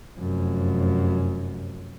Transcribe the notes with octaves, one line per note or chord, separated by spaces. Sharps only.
F1 F#2